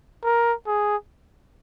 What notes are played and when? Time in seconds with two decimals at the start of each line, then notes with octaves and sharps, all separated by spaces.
0.24 A#4
0.66 G#4